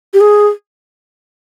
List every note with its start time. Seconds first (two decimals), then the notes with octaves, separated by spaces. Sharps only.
0.14 G4
0.21 G#4